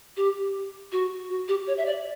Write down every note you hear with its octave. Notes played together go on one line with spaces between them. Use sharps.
G4
F#4
F#4
G4
C#5
E5
D5